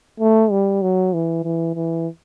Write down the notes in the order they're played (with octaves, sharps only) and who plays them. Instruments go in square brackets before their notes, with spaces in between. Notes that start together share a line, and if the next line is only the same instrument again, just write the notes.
[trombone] A3
G3
F#3
E3
E3
E3